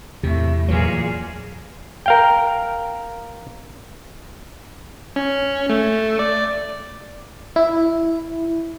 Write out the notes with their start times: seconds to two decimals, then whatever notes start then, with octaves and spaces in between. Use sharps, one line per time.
0.23 E2 A2 C3
0.68 A#2 E3 F#3 G#4
2.06 A#4 F5 G5
5.16 C#4
5.70 A3
6.19 D5
7.56 E4